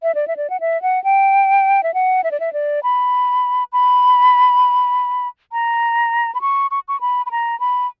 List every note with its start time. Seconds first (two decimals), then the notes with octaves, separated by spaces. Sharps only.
0.03 E5
0.15 D5
0.28 E5
0.37 D5
0.50 F#5
0.60 E5
0.82 F#5
1.04 G5
1.83 E5
1.94 F#5
2.24 E5
2.31 D5
2.40 E5
2.53 D5
2.83 B5
3.73 B5
5.52 A#5
6.35 B5
6.41 C#6
6.71 C#6
6.88 C#6
7.01 B5
7.26 B5
7.31 A#5
7.60 B5